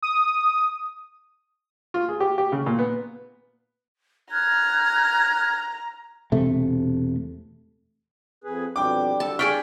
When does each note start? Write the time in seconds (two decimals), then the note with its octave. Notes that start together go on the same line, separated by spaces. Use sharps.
0.02 D#6
1.94 F4
2.09 G#4
2.20 G4
2.38 G4
2.52 C#3
2.66 A#2
2.79 B3
4.32 A#5 F6 F#6 G#6
6.32 E1 C3 A3
8.44 F2 G#4 B4
8.76 F2 B2 G3 D4 G5 D6
9.20 D3 G3 A4 A5
9.39 G#4 D5 G5 C#6 F6 B6